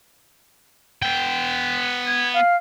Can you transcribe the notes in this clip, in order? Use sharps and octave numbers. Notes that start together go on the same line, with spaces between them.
B3 G5
G#6
F5